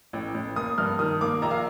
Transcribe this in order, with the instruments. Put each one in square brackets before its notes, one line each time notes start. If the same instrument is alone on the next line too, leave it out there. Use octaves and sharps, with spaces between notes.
[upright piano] A1
A1
A#3 D#6
G2 F6
D#3 D#6
A#3 D6
A#1 A#5
F5